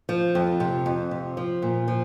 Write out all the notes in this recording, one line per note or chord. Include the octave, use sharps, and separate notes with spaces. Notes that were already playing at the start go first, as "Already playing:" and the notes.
F3
F2
C3
F2
C3
F3
A#2
F3